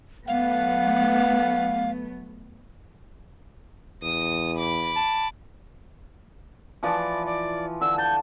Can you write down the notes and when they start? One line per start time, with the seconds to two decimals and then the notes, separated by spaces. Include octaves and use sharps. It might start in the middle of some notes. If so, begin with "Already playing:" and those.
0.28 F#3 A3 B3 F5 F#5
4.03 E2 D#6
4.58 B5 D6
4.96 A5
6.83 E3 F3 B4 D5
7.26 D5
7.81 D3 E6
7.98 A5 G6